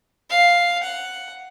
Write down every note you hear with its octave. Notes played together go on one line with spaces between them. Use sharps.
F5
F#5